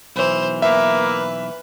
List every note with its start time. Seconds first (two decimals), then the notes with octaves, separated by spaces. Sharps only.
0.16 B1 E3 C5
0.62 A#3 B4 E5